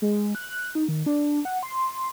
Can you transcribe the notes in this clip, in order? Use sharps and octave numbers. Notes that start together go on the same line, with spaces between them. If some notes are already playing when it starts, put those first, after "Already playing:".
G#3
F#6
D#4
D#3
D4
F#5
C6